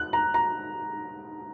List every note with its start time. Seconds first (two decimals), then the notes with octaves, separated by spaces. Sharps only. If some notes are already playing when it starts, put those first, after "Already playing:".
Already playing: F#6
0.13 A#5
0.34 A#5